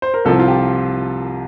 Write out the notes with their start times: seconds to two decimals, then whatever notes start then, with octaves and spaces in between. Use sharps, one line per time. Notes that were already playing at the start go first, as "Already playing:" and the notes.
0.02 C5
0.14 A#4
0.25 C2 C3 F3 A4
0.39 F4
0.48 G4